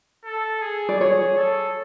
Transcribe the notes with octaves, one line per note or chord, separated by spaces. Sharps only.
A4
G#4
D5
G#4 C#5
A4